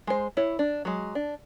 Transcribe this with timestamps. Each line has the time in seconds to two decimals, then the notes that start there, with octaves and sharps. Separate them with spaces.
0.07 G#3 C5
0.37 E4 C#5
0.59 D4
0.85 F#3 G#3
1.15 D4